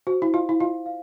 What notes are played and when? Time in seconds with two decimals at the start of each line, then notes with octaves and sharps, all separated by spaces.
0.07 F#4 C5
0.22 E4
0.34 F4 F5
0.49 E4
0.60 F4 F5
0.86 F5